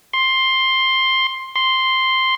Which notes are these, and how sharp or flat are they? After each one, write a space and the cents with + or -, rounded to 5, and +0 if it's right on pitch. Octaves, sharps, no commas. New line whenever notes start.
C6 +10
C6 +0